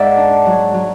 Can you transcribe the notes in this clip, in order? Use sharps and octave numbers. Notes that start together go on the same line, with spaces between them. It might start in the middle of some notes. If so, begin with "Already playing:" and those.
Already playing: G#2 D5 E5 F#5
D4
F#3
F#3